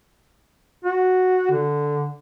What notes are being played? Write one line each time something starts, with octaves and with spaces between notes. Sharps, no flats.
F#4
D3